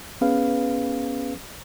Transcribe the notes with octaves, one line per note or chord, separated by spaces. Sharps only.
B3 C#4 G#4 B4 F5